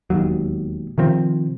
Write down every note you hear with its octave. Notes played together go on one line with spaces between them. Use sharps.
E1 D#2 F#3
C3 D#3 F3 C4